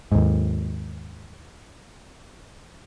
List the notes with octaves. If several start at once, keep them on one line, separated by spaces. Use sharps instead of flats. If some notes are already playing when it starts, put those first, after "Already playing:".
D#2 G#2